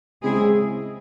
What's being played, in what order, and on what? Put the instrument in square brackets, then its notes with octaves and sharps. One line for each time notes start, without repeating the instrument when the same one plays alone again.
[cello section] C#3 G#3 C4 E4 G#4